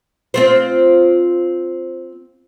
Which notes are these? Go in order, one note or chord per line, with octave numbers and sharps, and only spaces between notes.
C4 F4 C5